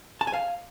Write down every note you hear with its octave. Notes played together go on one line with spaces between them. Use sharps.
A5
G#5
F5